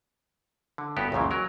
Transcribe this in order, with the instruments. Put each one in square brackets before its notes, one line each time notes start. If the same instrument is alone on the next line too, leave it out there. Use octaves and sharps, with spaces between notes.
[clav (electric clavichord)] D3
G1 G2 B3 F#4 G4
C#2 F#2 A#2 C#3 E3
F#3 A#4